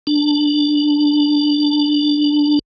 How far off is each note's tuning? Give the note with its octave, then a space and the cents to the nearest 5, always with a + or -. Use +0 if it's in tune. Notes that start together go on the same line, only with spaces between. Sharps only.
D4 +5